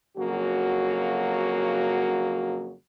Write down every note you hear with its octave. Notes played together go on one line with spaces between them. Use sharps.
F2 C#3 F#3 A#3 F#4